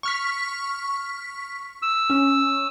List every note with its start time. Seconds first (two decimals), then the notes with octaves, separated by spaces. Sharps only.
0.03 C#6 F6 B6
1.82 E6
2.10 C#4